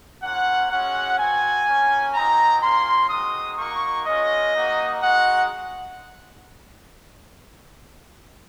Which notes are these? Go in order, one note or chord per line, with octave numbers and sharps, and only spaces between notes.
A#3 C#4 F4 F#5
G#3 C#4 F#4 F#5
C4 F#4 G#5
A#3 C#4 F#4
C4 D#4 F#4 A#5
A#3 C#4 F4 C6
G#3 C4 D#4 F#4 D#6
A#3 D#4 F#4 C#6
G#3 C#4 F4 D#5
A#3 D#4 F#4
G#3 D#4 F#4 F#5